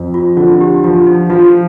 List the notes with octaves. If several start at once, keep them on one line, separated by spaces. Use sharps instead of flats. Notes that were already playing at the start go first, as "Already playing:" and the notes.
Already playing: F2
F4
D3 F4
G4
F3 F4
D#4
F3 F4